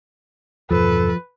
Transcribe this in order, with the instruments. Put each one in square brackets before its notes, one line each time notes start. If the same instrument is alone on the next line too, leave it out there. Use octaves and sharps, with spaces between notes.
[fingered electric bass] E2 G2 B2 [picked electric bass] F3 [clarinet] A4 [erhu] B4